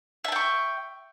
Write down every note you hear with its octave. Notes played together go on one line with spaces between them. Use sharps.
E5 G5 A5 C#6